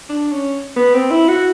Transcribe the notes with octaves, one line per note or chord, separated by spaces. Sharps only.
D4
C#4
B3
C4
E4
F#4